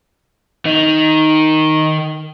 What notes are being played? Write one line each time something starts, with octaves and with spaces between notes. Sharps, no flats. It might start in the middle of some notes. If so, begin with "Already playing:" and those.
D#3 D#4